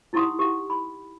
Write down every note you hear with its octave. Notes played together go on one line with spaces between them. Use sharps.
D#4 E4 G4 F#5 C6 D#6
G4 F#5
B5